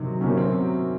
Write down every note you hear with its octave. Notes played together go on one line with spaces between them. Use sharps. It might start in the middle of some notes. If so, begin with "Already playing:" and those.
Already playing: C3 D#3 F#3 D#4
C3 D#3 F#3 C#4
C4